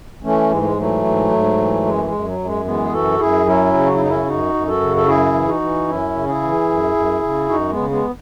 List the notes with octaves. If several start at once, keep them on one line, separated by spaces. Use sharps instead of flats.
E3 A3 C#4
G#2 G#3
A3
G#3
E3 F#3 A3
G#2
G#2
E3
F#2 G#3
A3
G#3
F#2
F#3
F#2
G#3
E3 G#3 B3
G#4
F#2 F#4 A4
F#2 E4 G#4
F#3 C#4 E4
C#3
F#4
E4
F#2 D#4
C#4 E4
F#2 D#4 F#4
F#2
F#4 A4
C#3
A4
F#2 E4 G#4
E3
D#4 F#4
E3
F#2 C#4 E4
C#3
E4 G#4
E3
F#2
F#2
C#3
F#2 D#4 F#4
G#3 B3
C#3
G#3 B3